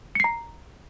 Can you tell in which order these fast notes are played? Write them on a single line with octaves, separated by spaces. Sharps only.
C#7 C7 A#5